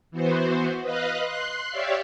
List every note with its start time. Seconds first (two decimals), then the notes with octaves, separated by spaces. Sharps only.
0.11 E3 B3 F#4 C5
0.82 B4 D#5 F5 F#6
1.22 C6 F#6 C7
1.71 G4 C#5 D5 E5 F5